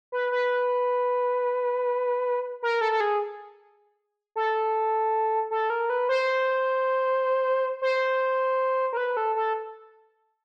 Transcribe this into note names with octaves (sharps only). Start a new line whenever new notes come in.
B4
B4
A#4
A4
A4
G#4
A4
A4
A#4
B4
C5
C5
A#4
B4
A4
A4